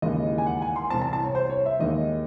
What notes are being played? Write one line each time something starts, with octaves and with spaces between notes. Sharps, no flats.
D#2 C#3 E3 G#3 D#5
G#5
F#5
G#5
C6
C2 C3 E3 C4 A5
A5
A5
C#5
C5
C#5
E5
D#2 D#3 G#3 D#5